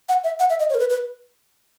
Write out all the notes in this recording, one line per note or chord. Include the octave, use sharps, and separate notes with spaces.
F#5
E5
F#5
E5
D#5
C#5
A#4
B4
B4